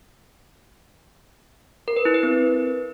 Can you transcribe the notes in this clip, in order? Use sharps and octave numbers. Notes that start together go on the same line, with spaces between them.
A#4
B4
E4
B4
C4